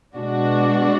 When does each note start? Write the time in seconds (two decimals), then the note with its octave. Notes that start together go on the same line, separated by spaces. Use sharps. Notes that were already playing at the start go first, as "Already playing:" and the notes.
0.16 B2 G#3 D4 F#4